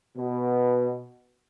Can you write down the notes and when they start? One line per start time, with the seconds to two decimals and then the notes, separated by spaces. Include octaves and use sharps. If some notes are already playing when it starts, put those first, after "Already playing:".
0.17 B2